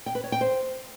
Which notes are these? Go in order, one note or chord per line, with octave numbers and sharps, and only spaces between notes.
G5
B4
C#5
G5
C5